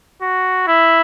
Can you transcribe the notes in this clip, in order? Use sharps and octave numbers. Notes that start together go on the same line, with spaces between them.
F#4
E4